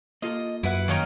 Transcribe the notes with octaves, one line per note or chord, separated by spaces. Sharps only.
A#3 F4 A4 D#5
F#2 E4 B4 F#5
D#3 A#3 C#4 D#4 G5